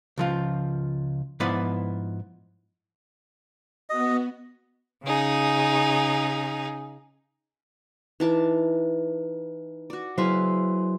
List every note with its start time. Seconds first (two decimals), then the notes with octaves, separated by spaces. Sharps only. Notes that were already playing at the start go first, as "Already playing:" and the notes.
0.18 C#2 F3 F4
1.40 G#2 F3 B3 E4 B4 D5
3.90 B3 F#4 D#5
5.03 C#3 D#4 G#4
8.20 E3 D#4 E4 B4 A5 D6
9.90 F#4 D5
10.18 F#3 E4 G#4 B4 C5 F5 C6